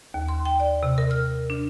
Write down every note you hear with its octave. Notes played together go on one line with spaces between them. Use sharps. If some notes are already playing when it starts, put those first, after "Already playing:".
D#2
C6
G5
D5
C3
A#4
F6
D4